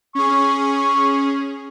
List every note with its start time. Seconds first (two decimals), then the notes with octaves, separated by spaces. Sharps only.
0.15 C#4 G#4 C#6